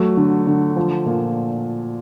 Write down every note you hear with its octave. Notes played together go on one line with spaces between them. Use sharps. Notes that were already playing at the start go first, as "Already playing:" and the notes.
Already playing: F#3 A3
D3
D3
F3
A#2